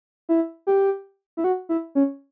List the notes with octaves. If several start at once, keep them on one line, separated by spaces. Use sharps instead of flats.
E4
G4
E4
F#4
E4
C#4